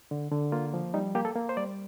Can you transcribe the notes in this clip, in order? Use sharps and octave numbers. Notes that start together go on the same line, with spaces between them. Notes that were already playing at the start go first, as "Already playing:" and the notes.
D3
D3
A#3 F4
F3
G3 D#4
A#3 G4
A4
A#3
C5
G3 D5